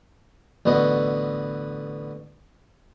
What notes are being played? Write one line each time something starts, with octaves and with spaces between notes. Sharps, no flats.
A1 D3 B3 F#4 D#5